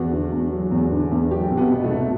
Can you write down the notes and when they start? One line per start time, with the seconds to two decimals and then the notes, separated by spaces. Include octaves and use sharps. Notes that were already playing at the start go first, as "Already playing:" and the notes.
Already playing: E2 F#4
0.12 D3
0.32 E2
0.52 F#3
0.72 E2
0.92 D3
1.12 E2
1.31 F#3 G4
1.50 C2
1.57 B3
1.71 B2
1.84 A3
1.91 C2